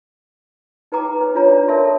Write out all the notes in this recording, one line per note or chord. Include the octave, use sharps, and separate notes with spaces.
D#4 B4 G5 A#5 D6
B4 C5
D4 F4 C#5 A#5
D5
A#4 C#5 E5 A5 C6
A4